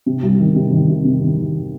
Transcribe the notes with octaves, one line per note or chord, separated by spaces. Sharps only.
C3
C2
D#3
C3
D#3
C3
C3
D#3
D#3